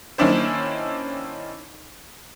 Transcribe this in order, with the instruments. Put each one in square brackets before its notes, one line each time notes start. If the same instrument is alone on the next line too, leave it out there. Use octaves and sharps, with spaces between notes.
[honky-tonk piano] D#3 A#3 C#4 D4 E4 C5